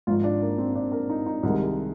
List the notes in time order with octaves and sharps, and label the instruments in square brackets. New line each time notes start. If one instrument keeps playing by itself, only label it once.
[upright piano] G#1 G#2 F3 F4
D4
A#3
C4
D4
A#4
D#4
D#4
C2 C3 D#3 G#3